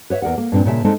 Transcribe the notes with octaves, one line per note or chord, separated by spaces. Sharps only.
B4 C#5 D#5 E5
E2 A#4 D5 F#5
A#3
G2 A#2 C4 D4
A#2 C#3 E5 A5
G#3 A3 C4 D4 D#4 A4